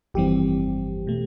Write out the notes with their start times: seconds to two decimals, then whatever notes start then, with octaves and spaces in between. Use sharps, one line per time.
0.14 G1 F2 E3 G3 C4 G4
1.07 B2 A3